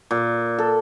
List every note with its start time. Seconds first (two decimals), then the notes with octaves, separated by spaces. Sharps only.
0.11 A#2
0.58 A4